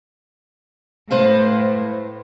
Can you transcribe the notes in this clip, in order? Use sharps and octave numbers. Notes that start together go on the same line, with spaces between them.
A2 B4 C5 F5